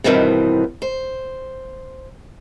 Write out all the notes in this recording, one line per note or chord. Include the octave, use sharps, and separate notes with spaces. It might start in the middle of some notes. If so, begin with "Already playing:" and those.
G2 B2 D#3 E3 C4
C5